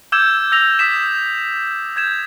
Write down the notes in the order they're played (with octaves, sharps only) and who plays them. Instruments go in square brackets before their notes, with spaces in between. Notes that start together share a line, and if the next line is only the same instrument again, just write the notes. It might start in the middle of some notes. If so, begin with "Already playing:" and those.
[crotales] D6 E6 G6 G#6 E7
E6 A#6 F7
D#6 E6 B6 E7
G6 G#6 E7